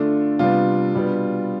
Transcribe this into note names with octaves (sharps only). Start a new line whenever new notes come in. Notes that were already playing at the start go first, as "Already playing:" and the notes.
Already playing: D3 A3 D4 F4
C3 G3 B3 D4 F4
B2 G3 B3 D4